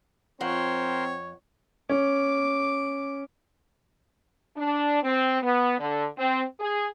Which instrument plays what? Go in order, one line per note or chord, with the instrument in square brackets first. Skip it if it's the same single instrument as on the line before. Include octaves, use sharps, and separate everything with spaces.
[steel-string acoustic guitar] F2 F#5 [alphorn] C4 [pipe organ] A#4 C5 C6 [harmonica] C#5
[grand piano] C#4 [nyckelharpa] D6
[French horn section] D4
C4
B3
D3
C4
G#4